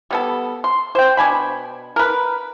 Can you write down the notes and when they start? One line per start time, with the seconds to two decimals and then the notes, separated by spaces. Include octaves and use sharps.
0.11 G3 B3 A4
0.64 C6
0.95 C5 G5
1.17 B2 D4 G#5 B5
1.96 A#4 B4